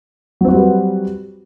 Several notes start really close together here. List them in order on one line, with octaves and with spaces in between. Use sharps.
F#3 C4 F#4 G3 B4